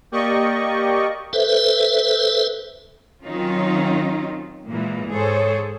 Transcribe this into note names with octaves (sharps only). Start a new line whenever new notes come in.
A#3 G4 D5 D#5 C#6
A4 B4 C5 E5
D#3 F#3 C4 C#4 D#4 F4
A#2 E3 G#3 A#3
G#2 G#4 A4 C5 C#5